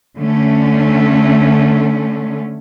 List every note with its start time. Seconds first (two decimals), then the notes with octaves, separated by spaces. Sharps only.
0.18 D3 A3 C#4